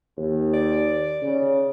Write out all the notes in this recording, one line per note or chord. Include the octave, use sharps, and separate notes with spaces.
D#2
D5
C#3